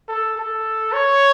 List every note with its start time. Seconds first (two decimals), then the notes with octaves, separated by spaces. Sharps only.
0.08 A4
0.37 A4
0.93 C#5